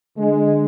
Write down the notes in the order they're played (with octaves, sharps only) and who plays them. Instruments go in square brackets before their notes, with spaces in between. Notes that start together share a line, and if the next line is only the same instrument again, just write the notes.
[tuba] D3 [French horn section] G#3